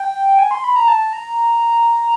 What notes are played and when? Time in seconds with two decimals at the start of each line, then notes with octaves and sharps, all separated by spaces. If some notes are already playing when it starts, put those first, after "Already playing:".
Already playing: G5
0.39 G#5
0.51 C6
0.64 B5
0.76 A#5
0.88 A5
1.13 A#5